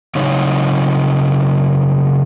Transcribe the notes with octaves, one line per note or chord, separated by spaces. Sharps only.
C#3 F#3 D#4 C#5